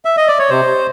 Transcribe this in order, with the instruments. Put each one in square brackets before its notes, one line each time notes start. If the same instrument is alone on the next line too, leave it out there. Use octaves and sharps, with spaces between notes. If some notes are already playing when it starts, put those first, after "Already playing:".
[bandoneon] E5
D#5
D5
C#5
C3 C5